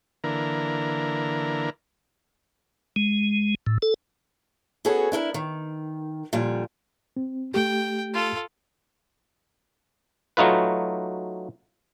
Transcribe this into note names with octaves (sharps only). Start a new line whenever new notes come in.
D3 E3 A#3 A#4
G#3
A2
A4
B3 C#4 F#4 G#4 A4
D4 E4 A4 A#4
D#3
A#2 D3 F3 G3
C4
A3 G4 G5
F4 A4
F#3 A3 D#4 F4 B4